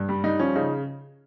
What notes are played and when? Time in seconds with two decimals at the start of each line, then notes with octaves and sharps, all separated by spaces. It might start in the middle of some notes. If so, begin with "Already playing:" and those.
Already playing: G2
0.09 G3
0.24 G3 D#4
0.39 F3 C#4
0.55 C#3 D#4